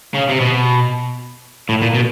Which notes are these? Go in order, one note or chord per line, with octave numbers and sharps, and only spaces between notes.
C#3
C3
B2
A2
A#2
B2